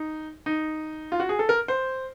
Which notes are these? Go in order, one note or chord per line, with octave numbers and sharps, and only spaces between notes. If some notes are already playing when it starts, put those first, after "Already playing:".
Already playing: D#4
D#4
F4
F#4
G#4
A4
A#4
C5